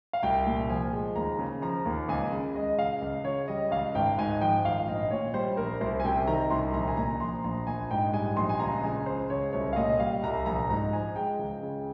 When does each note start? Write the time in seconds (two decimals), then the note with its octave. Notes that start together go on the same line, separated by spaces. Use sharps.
0.13 F5
0.23 C2 G5
0.46 A#2
0.69 F3 G#5
0.93 G#3
1.16 D#2 A#5
1.39 C#3
1.62 F3 A#5
1.86 D#2
2.08 C#2 G#5
2.31 C#3
2.55 G#3 D#5
2.78 C#2 F5
3.02 C#2
3.24 C#3 C#5
3.48 G3 D#5
3.71 C#2 F5
3.95 G#1 G5
4.18 G#2 G#5
4.41 F3 G5
4.64 G#1 F5
4.87 A#1 D#5
5.11 A#2 C#5
5.34 G3 C5
5.57 A#1 A#4
5.81 C2 C5
6.00 G#5
6.05 C3 G5
6.27 D#3 A#5
6.50 C2 C6
6.74 A#1 A#5
6.87 G#5
6.97 A#2 A#5
7.20 F3 C6
7.44 A#1 A#5
7.67 A#1 G#5
7.91 G#2 G5
8.14 G3 G#5
8.37 A#1 C6
8.49 G#5
8.60 C#2 A#5
8.83 C#3 G#5
9.06 G#3 C5
9.30 C#2 C#5
9.53 C2 C#5
9.73 F5
9.76 A#2 D#5
10.00 G3 F5
10.23 C2 A#5
10.46 A#1 A#5
10.70 G#2 A#5
10.93 F3 G#5
11.16 G#3 G5
11.39 C#2
11.62 C#3